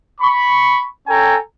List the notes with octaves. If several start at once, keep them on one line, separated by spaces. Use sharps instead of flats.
B5 C#6
C#4 A4 G5 G#5 A#5